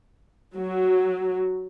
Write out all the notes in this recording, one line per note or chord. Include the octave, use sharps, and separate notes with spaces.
F#3